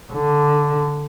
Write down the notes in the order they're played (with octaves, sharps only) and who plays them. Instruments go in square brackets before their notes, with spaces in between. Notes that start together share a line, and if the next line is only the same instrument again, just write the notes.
[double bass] D3